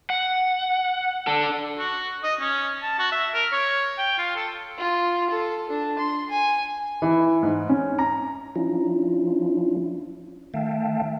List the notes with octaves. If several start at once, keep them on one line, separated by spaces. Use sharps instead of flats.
F#5
D4 A4
F#4
D#5
C#4
A5
F#4
E5
A#4
C#5
G5
F4
A4
F4
A4
D4
C6
G#5
E3
G#2
C#4
A#5
F3 C#4 D4 E4 F4
D#3 A3 E5 F5 G5 A5